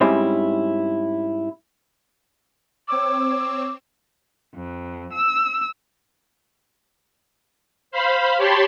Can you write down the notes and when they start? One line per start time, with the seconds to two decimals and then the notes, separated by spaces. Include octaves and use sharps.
0.01 G#2 G3 C4 C#4 E4
2.88 C4 C#5 D6 E6
4.54 F2
5.12 E6
7.91 C5 F5 B5
8.37 G4 C#5 A5 B5 C6